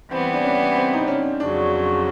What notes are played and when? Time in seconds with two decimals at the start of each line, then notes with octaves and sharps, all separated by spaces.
0.11 E3 G3 B3 C4
0.33 D4
0.44 C#4
0.76 C4
0.93 D#4
1.00 D4
1.08 C#4
1.40 F2 C#3 F#3 D4